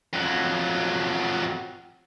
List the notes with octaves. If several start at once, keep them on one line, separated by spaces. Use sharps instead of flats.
F2 F#3